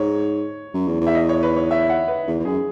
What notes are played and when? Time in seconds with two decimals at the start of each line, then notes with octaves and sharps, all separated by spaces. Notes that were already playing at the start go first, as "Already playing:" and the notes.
Already playing: G#2 C#5
0.74 F#2
0.87 E2
1.01 E2
1.07 E5
1.15 D#5
1.29 C#5
1.43 B4
1.57 C#5
1.71 E5
1.89 F#5
2.08 B4
2.27 E2
2.40 E2
2.45 F#2 G#4